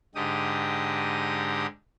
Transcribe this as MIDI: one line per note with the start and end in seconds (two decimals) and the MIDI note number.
0.15 1.66 44
0.15 1.66 50
0.15 1.66 63
0.15 1.66 67
0.15 1.66 87